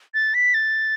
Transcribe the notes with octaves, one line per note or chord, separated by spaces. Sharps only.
A6
B6
A6